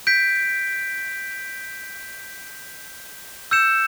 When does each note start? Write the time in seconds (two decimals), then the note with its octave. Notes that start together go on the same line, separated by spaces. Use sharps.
0.07 G6 B6 D7
3.51 E6 G6 C#7 E7